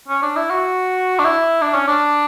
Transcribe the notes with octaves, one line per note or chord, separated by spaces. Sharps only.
C#4
D4
E4
F#4
D4
E4
D4
C#4
D4